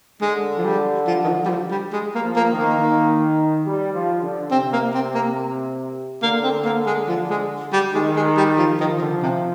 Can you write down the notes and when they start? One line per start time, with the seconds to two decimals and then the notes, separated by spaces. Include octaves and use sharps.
0.21 D3 G#3
0.58 F3
0.64 G3
1.07 F3
1.24 D#3
1.28 F3
1.45 G3
1.49 F3
1.71 G3
1.93 G#3
2.14 A#3
2.22 F3
2.36 A#3
2.50 D#3
2.57 A#3
2.78 D#3
3.65 G3
3.93 F3
4.22 D3
4.51 C3 C4
4.72 A#3
4.94 C4
5.14 A#3
6.22 D3 A#3
6.43 C4
6.65 A#3
6.86 G#3
7.08 F3
7.30 G#3
7.73 G3
7.94 D#3 G#3
8.16 G#3
8.37 G3
8.58 F3
8.80 D#3 F3
9.01 D3
9.23 C3